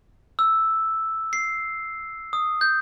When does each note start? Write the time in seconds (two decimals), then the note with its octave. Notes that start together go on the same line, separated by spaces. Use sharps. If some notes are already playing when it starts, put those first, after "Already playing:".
0.39 E6
1.33 C7
2.33 D#6
2.61 G6